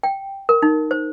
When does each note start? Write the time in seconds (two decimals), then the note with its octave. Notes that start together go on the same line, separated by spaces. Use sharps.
0.03 G5
0.49 A#4
0.62 D#4
0.91 C5